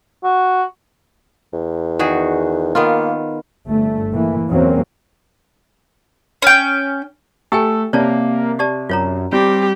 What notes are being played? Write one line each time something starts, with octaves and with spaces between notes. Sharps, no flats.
F#4
E2
D#3 F#4 G#4
D#3 A#3 B3 F4
G1 A3
E3 A#3
E2 F#3 A#3 C4 C#4
C#4 G5
A3 G4 A4 G5 G#5
C3 A#3 C#5 D5 A5
G4 D5 A5
F#2 F4 C#5 A#5
G3 C4 G4